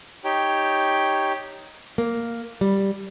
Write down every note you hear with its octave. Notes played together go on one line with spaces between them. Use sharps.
D#4 G4 C#5 G5
A#3
G3